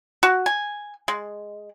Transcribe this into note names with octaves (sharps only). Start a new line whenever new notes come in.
F#4
G#5
G#3